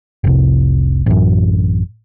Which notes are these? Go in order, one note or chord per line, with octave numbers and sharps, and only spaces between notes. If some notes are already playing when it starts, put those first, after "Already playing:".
F1 C2
A1 F#2